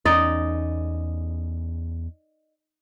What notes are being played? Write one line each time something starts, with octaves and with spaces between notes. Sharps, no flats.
E2 C#4 D#4 D5